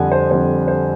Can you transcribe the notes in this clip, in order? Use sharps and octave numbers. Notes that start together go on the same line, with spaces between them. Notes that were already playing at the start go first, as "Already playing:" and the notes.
Already playing: F2 D3 G3 F#5 G#5
C5
F2 D3 G3 C5
C5